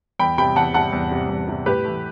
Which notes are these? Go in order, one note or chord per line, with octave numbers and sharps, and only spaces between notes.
E2 G5 B5
C3 G3 G5 B5
E2 F#5 A5
C3 G3 F#5 A5
E2
C3 G3
E2
C3 G3
A2 G4 B4
E3 A3